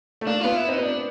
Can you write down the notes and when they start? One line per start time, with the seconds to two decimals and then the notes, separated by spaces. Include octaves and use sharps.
0.21 A3
0.27 A#3 D4
0.41 B3 F4
0.56 E4
0.68 C4 D#4
0.78 B3
0.82 D4